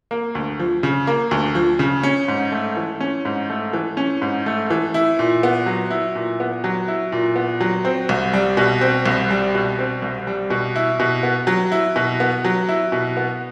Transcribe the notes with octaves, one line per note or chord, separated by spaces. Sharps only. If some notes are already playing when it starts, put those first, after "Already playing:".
A#3
D2
F3
C#3
A#3
D2
F3
C#3
C#4
G#2
A3
E3
C#4
G#2
A3
E3
C#4
G#2
A3
E3
E4
A#2
B3
F#3
E4
A#2
B3
F#3
E4
A#2
B3
F#3
C4
C2
G3
B2
C4
C2
G3
B2
C4
C2
G3
B2
E4
B2
B3
F#3
E4
B2
B3
F#3
E4
B2
B3